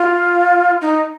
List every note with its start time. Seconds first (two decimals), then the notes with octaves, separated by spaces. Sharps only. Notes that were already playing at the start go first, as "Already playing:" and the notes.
Already playing: F4
0.82 D#4